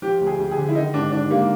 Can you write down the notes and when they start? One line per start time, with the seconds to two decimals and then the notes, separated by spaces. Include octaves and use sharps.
0.02 F3 G4
0.21 D2
0.27 G#4
0.39 D2
0.51 G#4
0.57 D3
0.68 E4
0.75 D#3 D#4
0.94 G#1 D4
1.12 G#1 D4
1.31 G#2 A#3